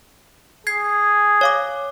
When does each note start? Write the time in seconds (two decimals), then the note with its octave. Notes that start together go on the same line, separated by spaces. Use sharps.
0.67 G#4 G#6 C7
1.41 C#5 F5 D6